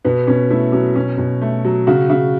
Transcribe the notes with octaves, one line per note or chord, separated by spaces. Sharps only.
B2 B3
B2 C#4
A3 E4
F#3 C#4
B2 C#4
B2
A3
F#3
C#3 F#4
C#3